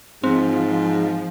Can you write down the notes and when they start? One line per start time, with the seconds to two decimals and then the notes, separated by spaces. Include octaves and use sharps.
0.24 G#2 F3 C4